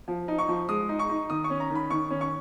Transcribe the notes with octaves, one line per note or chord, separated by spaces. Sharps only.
F3
D#4
C#6
F3
G#3 D#6
D#4
C#6
D#4
D#3 D#6
C#6
C#4
A#5
D#3
B5
D#3 C#6
C#4
C#6